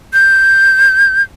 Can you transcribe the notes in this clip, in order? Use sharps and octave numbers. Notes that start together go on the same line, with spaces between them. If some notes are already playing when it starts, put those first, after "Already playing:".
G6